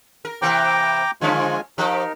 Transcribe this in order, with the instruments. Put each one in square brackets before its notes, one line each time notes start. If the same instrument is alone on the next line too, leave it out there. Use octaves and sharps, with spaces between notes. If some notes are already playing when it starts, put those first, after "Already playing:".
[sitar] A#4
[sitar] C3 E3 A#3 [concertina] G5 A#5 D6
[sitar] D3 F3 C#4 [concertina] G#3 F4 G#5
[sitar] F3 G4 [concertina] D#4 A#4